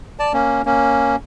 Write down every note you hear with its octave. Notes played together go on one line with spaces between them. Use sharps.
D5 A5
A#3 C#4
A#3 C#4